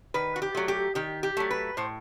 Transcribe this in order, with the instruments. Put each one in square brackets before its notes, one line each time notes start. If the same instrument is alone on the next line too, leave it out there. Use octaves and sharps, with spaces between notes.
[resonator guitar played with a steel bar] D#3 B4
F#4
G4
F#3 A3
G4
D#3 G4
G4
F#3 A3
B4
A2 C5